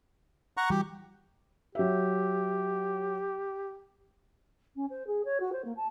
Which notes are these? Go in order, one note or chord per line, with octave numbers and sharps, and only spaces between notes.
F#5 A#5 C#6
E3 G3 F#4 G4
F#3 G4 E5
C#4
C5
G#4
C#5
F#4
C5
A#3
A5